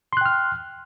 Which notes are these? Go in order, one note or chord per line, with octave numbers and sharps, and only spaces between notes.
G5 C6 F6 F#6